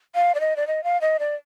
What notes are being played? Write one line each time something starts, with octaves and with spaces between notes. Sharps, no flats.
F5
D5
D#5
D5
D#5
F5
D#5
D5